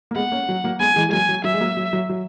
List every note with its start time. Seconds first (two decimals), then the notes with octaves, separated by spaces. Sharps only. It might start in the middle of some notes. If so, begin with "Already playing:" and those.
0.11 A#3
0.16 G#3 B3 F#5
0.31 A#3 C#4
0.49 F#3
0.64 F#3 A#3
0.80 G#3 B3 G#5
0.96 E3 G#3
1.09 G#3
1.12 F#3 A#3 G#5
1.29 F#3
1.44 F#3 E5
1.54 G#3
1.61 F#3 A#3
1.77 F#3
1.93 F#3
2.09 F#3